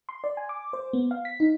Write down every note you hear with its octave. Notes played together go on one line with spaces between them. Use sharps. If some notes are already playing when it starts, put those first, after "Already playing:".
C6
D5
G#5
D6
C5
B3
F5
B6
D#4